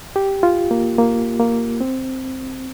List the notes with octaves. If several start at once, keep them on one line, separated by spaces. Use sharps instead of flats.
G4
F4
A#3
A#3
A#3
C4